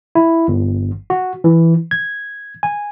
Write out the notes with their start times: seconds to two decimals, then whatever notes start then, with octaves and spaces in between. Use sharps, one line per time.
0.15 E4
0.48 G1
1.10 F#4
1.44 E3
1.91 G#6
2.63 G#5